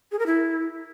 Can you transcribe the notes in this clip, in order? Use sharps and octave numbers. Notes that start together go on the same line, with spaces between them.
G#4
A#4
E4